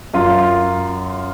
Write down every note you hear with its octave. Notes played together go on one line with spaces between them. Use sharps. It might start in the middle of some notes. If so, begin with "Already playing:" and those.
F#2 F4